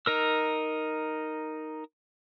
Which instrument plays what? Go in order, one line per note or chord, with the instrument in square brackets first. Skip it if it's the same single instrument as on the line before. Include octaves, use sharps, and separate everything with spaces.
[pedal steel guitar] D#4 A#4 E6